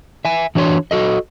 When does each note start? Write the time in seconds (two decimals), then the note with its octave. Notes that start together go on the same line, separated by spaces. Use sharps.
0.25 E5 G#5
0.55 E3 D4 F#4 C#5 C6
0.91 F#4 A4 D#5